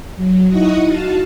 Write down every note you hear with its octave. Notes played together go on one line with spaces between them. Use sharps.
F#3
D#4 E4 D#5 F#5 C#6 D#6
F#4 F5 A5